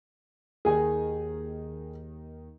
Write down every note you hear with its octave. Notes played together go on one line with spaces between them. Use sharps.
D#2 D#3 G#4 G#5